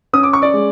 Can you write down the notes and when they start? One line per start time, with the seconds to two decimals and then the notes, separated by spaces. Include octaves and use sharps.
0.13 C#4 D#6
0.23 D6
0.33 C#6
0.42 D5 D6
0.54 G#3